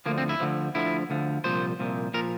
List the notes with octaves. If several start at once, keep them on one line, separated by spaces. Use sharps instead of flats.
D2 D3 F3 A#3
C4
E4
D2 D3 F3
D2 D3 F3 E4
D2 D3 F3
C2 A#2 F3 C5
C2 A#2 F3
A#2 F3 A#4